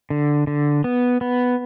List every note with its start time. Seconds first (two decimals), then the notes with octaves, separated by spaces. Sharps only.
0.10 D3
0.47 D3
0.84 B3
1.21 B3